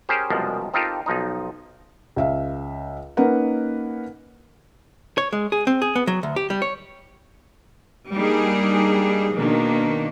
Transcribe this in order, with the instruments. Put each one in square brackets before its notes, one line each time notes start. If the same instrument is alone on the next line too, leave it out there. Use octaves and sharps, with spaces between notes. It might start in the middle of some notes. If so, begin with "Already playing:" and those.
[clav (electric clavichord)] C#4 G4 G#4 A#4 C5
C2 F#2 B2 F3 G3 G#3
C4 D#4 F4 G4 A4 A#4
B1 F3 D#4
[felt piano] C#2 E5 F5
A#3 C#4 D#4 A#4 B4 F#5
[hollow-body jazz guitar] C#5
G#3
G#4
C4
G#4
B3
F#3
D2
G4
G3
C#5
[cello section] G3 A#3 D4 D#4 G4 G#4
B2 D#3 A#3 D4